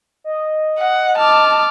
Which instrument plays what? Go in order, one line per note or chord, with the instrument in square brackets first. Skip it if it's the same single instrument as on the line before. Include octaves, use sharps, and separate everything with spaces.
[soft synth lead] D#5
[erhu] F#5
[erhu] A5 [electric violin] D6 F6